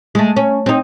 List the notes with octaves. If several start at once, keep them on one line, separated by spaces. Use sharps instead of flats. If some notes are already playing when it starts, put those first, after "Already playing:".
G#3 A3
C#4
C4 D#4